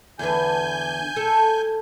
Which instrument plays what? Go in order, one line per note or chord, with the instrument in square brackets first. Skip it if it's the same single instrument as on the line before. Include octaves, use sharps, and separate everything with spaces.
[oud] E2 D3 B4 [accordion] G#5 G6
[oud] A4